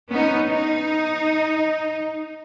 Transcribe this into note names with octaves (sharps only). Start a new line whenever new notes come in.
B3 C#4 D#4
D#4